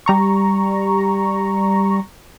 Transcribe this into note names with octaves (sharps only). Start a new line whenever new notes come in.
G3 A#5 C#6